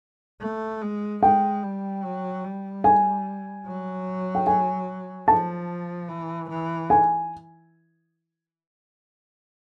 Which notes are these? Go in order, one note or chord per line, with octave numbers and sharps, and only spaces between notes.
A3
G#3
G#3 G5
G3
F#3
G3
G#5
F#3
G5
G#5
F3 A5
E3
E3
G#5